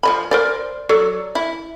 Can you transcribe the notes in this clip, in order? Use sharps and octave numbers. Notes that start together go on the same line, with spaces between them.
F3 D#5 B5
A#4 C5 D5
F#3 A4 D5
E4